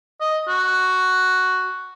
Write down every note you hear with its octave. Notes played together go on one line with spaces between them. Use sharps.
D#5
F#4